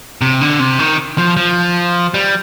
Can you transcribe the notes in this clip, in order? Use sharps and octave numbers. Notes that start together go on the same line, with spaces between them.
C3
D3
C3
D#3
F3
F3
G3